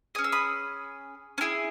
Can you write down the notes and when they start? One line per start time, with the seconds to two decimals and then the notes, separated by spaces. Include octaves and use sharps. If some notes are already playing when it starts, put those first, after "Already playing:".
0.15 C#4 G#4 D#6
0.24 E6
0.32 B5 D#6
1.38 C#4
1.41 E4 G#4